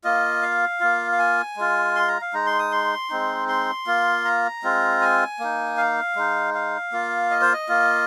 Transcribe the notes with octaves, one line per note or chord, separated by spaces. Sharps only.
A#3 F4 D#5
F5
A#3 F4
F5
G#5
G#3 F4
C6
A#5
F5
G#3 D#4 A#5
C6
D#6
C6
G#3 C4 D#4
C6
A#3 F4
A#5
G#3 C4 F4
G#5
A#3 D#4
F5
G#3 D#4
F5
A#3 F4
D#5
C5
D#5
A#3 F4